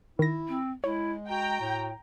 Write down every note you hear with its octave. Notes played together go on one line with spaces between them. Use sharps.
D#3 E4 A#6
C4
G#3 E4 C#5
F#4 G5 A#5
A2